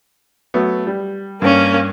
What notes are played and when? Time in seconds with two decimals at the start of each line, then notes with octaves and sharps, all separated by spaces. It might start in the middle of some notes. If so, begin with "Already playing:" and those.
0.54 F#3 A3 B3
0.87 G3
1.42 G2 A#3 C#4